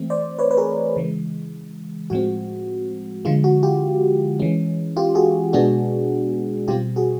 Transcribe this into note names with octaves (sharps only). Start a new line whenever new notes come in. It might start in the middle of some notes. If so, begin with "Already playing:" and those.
Already playing: E3 A3 C4
C5 D5
B4 C#5
B4
G#4 A#4
C#3 E3 G#3
A2 F3 G#3 C4 F#4
D3 F3 G#3 F4
F#4
F4 G4
E3 G#3 C#4
F4 G4
F#4 G#4
B2 G#3 B3 D4 F#4 G#4
B2 G3 C4 F4 G4
F#4 G#4